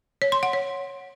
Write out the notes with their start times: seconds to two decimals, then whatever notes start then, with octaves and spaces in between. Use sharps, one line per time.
0.22 C#5
0.32 C6
0.43 F#5
0.53 C#5